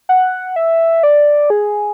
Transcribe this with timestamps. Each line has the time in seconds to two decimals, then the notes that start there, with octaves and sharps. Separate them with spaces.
0.09 F#5
0.56 E5
1.03 D5
1.50 G#4